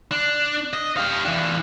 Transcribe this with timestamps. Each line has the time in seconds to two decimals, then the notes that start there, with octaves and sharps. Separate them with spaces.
0.11 D4
0.73 D#5
0.97 G4 F5
1.25 E3 D4